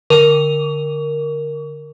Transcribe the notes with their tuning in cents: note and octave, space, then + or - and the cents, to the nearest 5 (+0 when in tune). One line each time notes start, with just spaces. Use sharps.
D3 +0 A#4 +0 C#6 +35